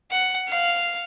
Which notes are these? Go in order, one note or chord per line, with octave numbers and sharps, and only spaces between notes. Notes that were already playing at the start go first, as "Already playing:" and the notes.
F#5
F5